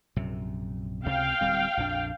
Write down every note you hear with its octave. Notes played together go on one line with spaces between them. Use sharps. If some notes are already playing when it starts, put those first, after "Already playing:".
A#1 F#2 C3
C#2 C3 F5 G5
D1 G3 C4
A#1 F2 D4